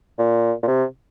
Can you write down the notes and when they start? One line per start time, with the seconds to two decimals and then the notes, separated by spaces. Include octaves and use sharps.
0.18 A#2
0.63 A#2
0.67 C3